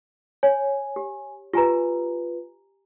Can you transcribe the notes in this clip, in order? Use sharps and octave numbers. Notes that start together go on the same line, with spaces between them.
C#5 G#5
G4
F4 G4 B4 G#5 A#5